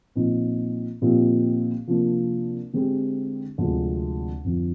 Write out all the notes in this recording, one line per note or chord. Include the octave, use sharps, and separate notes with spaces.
A#2 F3 C4 D#4
A#2 F3 C4 D#4 G4
C3 F3 A#3 D4
D3 G#3 C4 G4
D2 C3 F3 G#3 D4
F2 D3 F3